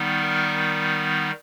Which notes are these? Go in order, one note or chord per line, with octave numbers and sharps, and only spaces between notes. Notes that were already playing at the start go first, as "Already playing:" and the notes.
Already playing: D#3 G3 B3 D#4
A#4